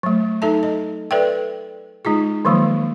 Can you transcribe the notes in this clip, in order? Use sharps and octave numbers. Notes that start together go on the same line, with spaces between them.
F#3 A3
D#4 A4 E5 A5
D#5
A4 B4 D5 E5 G5
G#3 D#4 F4 G#4
D#3 F3 F#3 G#3 A#3